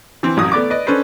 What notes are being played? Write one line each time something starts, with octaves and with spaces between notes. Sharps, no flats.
E3 C4
A1 F#2 D#6
A3 B3 D5 D6
B4 D5 D#5
C#4 D4 A4 B4 C5